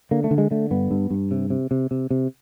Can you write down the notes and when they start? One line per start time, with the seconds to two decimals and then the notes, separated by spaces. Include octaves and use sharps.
0.11 D3 A#3
0.24 A3
0.31 D3
0.38 G#3
0.51 D3 A3
0.71 G2 B3
0.91 G2
1.10 G2
1.31 C3
1.50 C3
1.71 C3
1.91 C3
2.11 C3